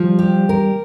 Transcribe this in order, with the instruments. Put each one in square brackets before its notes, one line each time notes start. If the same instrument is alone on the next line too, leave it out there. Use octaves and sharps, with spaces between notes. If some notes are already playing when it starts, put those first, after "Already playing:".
Already playing: [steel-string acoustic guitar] F3 [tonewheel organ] G3
[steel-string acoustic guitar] G4
A#4